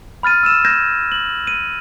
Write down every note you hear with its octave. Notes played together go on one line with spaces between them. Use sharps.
B5 F6 A6 D#7
E6 D#7 E7
G6 G#6 A#6 E7
F#7
D#7